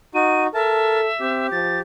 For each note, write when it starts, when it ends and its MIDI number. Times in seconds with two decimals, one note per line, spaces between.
0.15 0.47 63
0.15 0.47 66
0.15 0.43 99
0.54 1.09 69
0.54 1.00 70
0.54 1.47 76
0.54 1.00 81
1.20 1.49 60
1.20 1.81 67
1.52 1.81 53
1.52 1.79 93